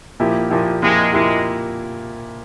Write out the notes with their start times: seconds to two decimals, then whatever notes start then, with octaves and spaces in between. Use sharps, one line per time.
0.20 A#2 F3 A#3 E4 G4
0.50 A#2 F3 A#3 E4 G4
0.82 A#2 F3 G#3 A#3 E4 G4
1.13 A#2 F3 G#3 A#3 E4 G4